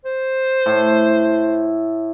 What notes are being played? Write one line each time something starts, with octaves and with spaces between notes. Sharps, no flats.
C5
A2